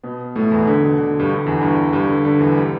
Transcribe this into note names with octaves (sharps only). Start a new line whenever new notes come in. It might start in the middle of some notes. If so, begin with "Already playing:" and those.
B2 B3
A2 A3
E2 E3
D3
B2
D3
G2 G3
D3
E2 E3
G2 G3
G2 G3
D3
D3
E2 E3
G3